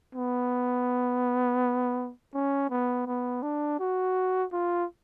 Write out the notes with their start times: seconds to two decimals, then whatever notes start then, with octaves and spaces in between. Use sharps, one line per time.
0.15 B3
2.34 C#4
2.70 B3
3.07 B3
3.43 D4
3.79 F#4
4.52 F4